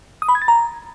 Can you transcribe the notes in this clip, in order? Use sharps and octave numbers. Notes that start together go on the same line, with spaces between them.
D#6
B5
G#6
A6
A#5